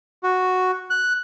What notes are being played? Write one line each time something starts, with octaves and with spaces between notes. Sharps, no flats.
F#4
F#6